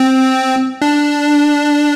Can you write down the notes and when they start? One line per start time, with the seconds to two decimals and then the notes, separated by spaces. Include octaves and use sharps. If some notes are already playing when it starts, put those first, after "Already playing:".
Already playing: C4
0.82 D4